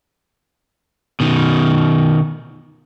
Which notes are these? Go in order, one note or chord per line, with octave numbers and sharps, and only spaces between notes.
B2 D#3